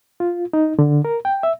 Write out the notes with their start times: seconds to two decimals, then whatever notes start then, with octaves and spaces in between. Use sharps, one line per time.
0.20 F4
0.53 D#4
0.79 D3
1.05 A#4
1.25 G5
1.43 E5